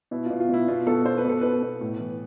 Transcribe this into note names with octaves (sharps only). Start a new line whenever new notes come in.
B2 E4
B2 F4
F4
B2 E4
B2 F4
B2 A4
B2 C5
B4
B2 A4
B2 B4
B2
A2
E3